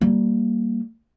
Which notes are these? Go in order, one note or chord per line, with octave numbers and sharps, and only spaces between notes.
G3 A#3